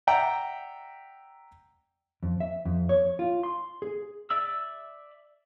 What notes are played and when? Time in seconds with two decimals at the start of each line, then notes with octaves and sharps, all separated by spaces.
0.07 D5 E5 F#5 G5 A#5
2.23 F2
2.40 E5
2.65 F2
2.89 C#5
3.19 F4
3.43 C6
3.82 G#4
4.30 D5 E5 E6